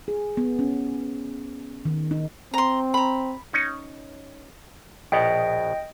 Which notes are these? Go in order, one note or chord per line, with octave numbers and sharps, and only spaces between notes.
G#4
B3
C#4
D#3
D#4
C4 A#5 C6
A#5 B5
C#4 D#4
A#1 B2 B3 D#5 G5